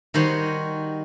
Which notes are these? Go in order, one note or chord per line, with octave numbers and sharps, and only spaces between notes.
D#3 G3 F#4 C5 C#5